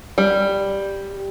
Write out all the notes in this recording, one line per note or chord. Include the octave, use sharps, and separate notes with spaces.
G3